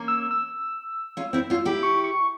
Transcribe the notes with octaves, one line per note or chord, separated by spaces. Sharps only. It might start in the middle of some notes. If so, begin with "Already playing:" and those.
Already playing: A#3 C#4
E6
E6
C#4 F4
C4 E4
C#4 F4
E4 G4
C#6
C#6